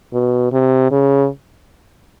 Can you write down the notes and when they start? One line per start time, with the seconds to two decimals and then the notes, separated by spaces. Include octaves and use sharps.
0.13 B2
0.52 C3
0.91 C#3